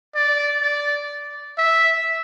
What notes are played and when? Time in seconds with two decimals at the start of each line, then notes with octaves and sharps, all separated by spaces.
0.15 D5
0.63 D5
1.58 E5